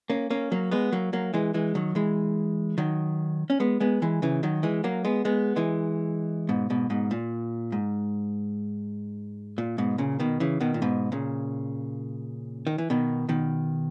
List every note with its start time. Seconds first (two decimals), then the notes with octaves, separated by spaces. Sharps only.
0.10 A#3 C#4
0.30 A#3 C#4
0.52 F#3 A#3
0.71 G#3 B3
0.92 F#3 A#3
1.13 F#3 A#3
1.34 E3 G#3
1.54 E3 G#3
1.75 D#3 F#3
1.95 E3 G#3
2.78 D#3 F#3
3.50 C#4
3.60 G#3 B3
3.80 G#3 B3
4.02 E3 G#3
4.22 C#3 E3
4.43 D#3 F#3
4.63 E3 G#3
4.84 F#3 A#3
5.05 G#3 B3
5.25 G#3 B3
5.56 E3 G#3
6.49 G#2 B2
6.70 G#2 B2
6.90 G#2 B2
7.11 A#2
7.72 G#2
9.58 A#2
9.78 G#2 B2
9.98 A#2 C#3
10.20 B2 D#3
10.40 C#3 E3
10.60 B2 D#3
10.74 A#2
10.82 G#2 B2
11.12 A#2 C#3
12.67 D#3
12.78 E3
12.90 B2 D#3
13.29 B2 D#3